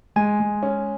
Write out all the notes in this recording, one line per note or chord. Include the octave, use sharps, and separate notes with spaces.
G#3 G#5
G#3
C#4